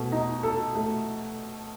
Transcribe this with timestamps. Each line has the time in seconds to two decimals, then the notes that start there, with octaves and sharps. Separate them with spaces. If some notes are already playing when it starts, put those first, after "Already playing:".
Already playing: B2 A3
0.12 D#4
0.43 A4
0.75 A3